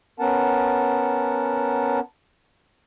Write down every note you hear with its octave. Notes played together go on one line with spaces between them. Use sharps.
B3 C#4 A#4 F#5 A5